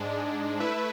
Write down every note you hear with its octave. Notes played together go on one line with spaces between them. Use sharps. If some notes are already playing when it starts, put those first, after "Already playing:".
Already playing: G#2 G#3 D4
A3 E4 B4 E5